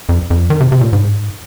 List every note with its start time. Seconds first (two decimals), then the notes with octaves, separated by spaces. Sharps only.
0.09 F2
0.30 F2
0.50 D#3
0.60 C3
0.72 C3
0.81 A#2
0.93 G#2